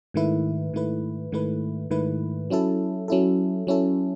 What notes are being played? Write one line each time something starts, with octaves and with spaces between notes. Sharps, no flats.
G#2 D#3 A3 E4 B4
G#2 D#3 A3 E4 B4
G#2 D#3 A3 E4 B4
G#2 D#3 A3 E4 B4
F#3 C#4 E4 A4
F#3 C#4 E4 A4
F#3 C#4 E4 A4